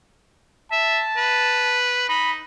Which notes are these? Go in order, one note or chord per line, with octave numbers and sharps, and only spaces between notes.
E5 A5
B4
D#4 B5